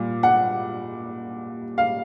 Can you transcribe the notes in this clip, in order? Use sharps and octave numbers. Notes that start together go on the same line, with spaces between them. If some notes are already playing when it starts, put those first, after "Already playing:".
Already playing: A#2 G3
F#5
F5